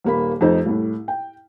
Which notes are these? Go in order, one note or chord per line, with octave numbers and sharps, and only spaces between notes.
D#1 A#3 B5
F1 F2 D#4 C5
C2 A2
G5